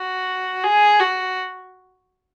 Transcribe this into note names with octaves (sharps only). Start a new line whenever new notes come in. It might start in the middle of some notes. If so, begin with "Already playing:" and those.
Already playing: F#4
G#4
F#4